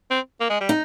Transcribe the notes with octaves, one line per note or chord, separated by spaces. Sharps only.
C4
A#3
G#3
G3
D#4